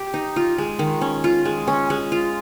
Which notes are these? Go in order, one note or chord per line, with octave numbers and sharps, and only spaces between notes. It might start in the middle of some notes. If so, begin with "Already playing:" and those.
Already playing: G4
D#4
F4
G#3
D#3
C#4
F4
G#3
C#4
G#3
F4